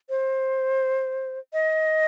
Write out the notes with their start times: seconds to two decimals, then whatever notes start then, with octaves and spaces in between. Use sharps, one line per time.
0.10 C5
1.53 D#5